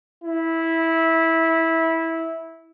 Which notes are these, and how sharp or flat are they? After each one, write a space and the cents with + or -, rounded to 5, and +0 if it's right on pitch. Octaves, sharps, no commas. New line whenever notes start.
E4 -15